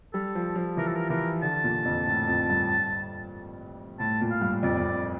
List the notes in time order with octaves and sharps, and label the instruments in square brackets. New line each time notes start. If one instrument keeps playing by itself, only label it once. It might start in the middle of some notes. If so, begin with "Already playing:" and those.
[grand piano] G3 [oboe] A4
[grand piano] F3
F3
[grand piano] E3 [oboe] A#4
[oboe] A4
A#4
[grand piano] E3 [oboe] A#4
[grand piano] D3 [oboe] A5
[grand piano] A#2
F2
A2
F2
G2
[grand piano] A2 [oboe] A5
[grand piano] A#2
[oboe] F5
[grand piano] G2
[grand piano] F2 [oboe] D5
[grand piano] F2